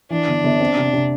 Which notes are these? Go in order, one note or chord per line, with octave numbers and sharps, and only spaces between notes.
E3 D4
G1
G1
C4
C3
C3